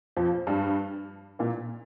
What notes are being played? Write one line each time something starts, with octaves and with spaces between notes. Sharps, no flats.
F2 F3
G2 G3
A#2 A#3